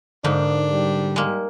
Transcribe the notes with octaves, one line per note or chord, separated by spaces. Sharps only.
G#2 D3 A#3 D4 D#4
G3
G#3 A#3